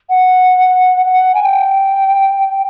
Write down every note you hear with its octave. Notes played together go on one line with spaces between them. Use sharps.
F#5
F#5
G#5
G5